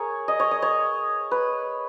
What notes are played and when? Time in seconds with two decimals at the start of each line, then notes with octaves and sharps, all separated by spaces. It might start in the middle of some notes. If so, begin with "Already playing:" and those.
Already playing: G#4 A#4 C#5
0.28 D#5
0.40 C#5
0.51 D#5
0.62 C#5
1.31 B4